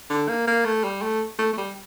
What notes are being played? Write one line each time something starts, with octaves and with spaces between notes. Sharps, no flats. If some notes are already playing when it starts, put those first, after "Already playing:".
D3
A#3
A#3
A3
G3
A3
A3
A3
G3